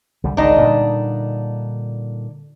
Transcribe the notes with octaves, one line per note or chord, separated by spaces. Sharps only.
C2 D3 G3
G#1 C#2 D4 D#4 D#5
A#2 D3 G3